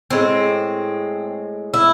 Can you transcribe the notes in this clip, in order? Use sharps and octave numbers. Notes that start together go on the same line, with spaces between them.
A2 G#3 C4
E4